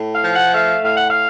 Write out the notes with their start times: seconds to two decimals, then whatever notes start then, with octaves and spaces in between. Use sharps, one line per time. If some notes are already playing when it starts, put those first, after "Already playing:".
Already playing: A2
0.14 F5
0.24 F3
0.34 F#5
0.53 A3 F5
0.83 A2 F5
0.97 F#5
1.10 F5